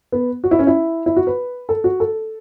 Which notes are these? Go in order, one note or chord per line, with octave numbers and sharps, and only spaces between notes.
B3
F#4
E4
C#4
E4
E4
F#4
B4
A4
F#4
A4